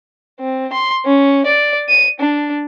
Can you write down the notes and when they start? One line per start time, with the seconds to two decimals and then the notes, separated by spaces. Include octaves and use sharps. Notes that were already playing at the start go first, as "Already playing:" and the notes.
0.40 C4
0.73 C6
1.05 C#4
1.46 D5
1.89 D#7
2.20 D4